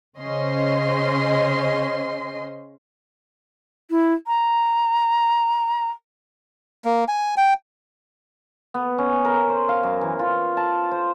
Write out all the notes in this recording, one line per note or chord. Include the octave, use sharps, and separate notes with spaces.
C#3 C#4 C5 D#5 C6
E4
A#5
A#3
G#5
G5
B3
C#4
A#4
C5
F5
F#2
E3
F4
A5
C5